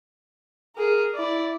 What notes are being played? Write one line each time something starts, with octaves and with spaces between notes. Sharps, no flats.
G#4 A#4
E4 D5